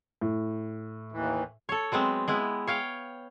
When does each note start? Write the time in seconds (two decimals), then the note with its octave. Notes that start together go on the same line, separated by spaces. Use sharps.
0.21 A2
1.12 D#2 E3
1.69 A4 C#5
1.92 F#3 G#3 B3 C4
2.28 G#3 B3 E4
2.67 C#5 F5 G5